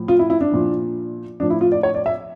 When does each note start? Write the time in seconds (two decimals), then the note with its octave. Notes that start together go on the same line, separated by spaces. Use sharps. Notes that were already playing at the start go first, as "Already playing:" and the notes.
Already playing: A2 F3
0.08 F4
0.19 E4
0.30 E4
0.41 D4
0.52 A#2 F3
1.40 A2 F3 D4
1.50 E4
1.61 F4
1.72 D5
1.83 C#5
1.95 D5
2.06 E5